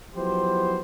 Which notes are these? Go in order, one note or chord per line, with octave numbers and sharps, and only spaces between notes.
F3 F#3 B3 E4 G4 C5